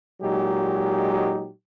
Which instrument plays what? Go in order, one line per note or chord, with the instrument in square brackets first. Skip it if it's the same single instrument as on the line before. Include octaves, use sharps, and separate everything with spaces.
[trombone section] A#2 F#3 G#3 D#4 G4